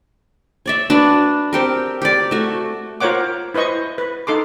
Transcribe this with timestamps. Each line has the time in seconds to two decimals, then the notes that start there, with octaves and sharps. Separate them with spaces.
0.66 C#5 D5 E5
0.90 D4 F#4 B4
1.53 C4 G4 A#4
2.02 G4 D5
2.31 A3 F#4
3.00 F4 A#4 C5 C#5 F#5 D6
3.54 E4 B4 C5 D#5 C#6
3.98 B4
4.27 D#4 A4 C6 D6